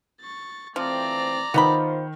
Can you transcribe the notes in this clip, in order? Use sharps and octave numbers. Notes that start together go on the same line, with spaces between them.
C#6 A6
E3 F3 A3 C4 D5 A#5
D#3 B3 D#4 F4 A#4 C5 B5